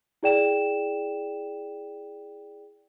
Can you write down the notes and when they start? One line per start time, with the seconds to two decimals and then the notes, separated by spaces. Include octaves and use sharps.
0.23 E4 G#4 D5 G5 E7